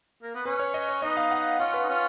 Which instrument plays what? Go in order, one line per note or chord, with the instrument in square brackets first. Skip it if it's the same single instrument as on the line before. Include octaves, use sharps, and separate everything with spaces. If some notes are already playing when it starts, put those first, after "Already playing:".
[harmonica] A#3
B3
[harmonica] C#4 [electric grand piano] B4
[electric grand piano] C#5
D#5
C#5
[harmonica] B3 D#4 [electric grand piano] D#5
[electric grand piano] F5
F#5
[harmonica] C#4 F4 [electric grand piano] F#5
[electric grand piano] B4
[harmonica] D#4
C#4 F4